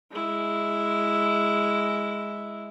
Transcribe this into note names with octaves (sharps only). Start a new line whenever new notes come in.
G#3 E4